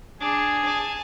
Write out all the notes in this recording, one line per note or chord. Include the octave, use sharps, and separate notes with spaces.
D4 G#4
G#5 A5